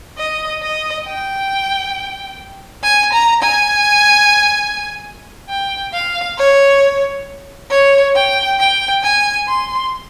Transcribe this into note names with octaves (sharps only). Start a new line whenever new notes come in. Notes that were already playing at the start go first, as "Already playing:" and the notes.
D#5
D#5
G5
G#5
A#5
G#5
G5
F5
C#5
C#5
G5
G5
G#5
C6